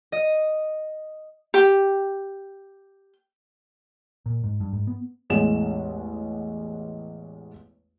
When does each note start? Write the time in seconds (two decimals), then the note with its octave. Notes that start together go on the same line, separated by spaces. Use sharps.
0.12 D#5
1.54 G4 G5
4.26 A#2
4.44 G#2
4.60 G2
4.73 G#2
4.87 B3
5.30 A1 E2 G#3 E7